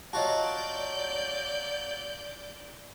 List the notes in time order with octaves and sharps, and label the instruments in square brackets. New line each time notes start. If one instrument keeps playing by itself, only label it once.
[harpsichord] F#3 F4 F#4 [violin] D5 G6 [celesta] D#5 A5